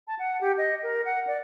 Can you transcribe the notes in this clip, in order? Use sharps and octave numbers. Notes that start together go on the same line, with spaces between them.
A5
F#5
G4
D#5
A#4
F#5
D5